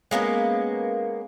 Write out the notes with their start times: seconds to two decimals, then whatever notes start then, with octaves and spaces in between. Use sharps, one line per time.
0.11 G#3 A#3 B3 C#4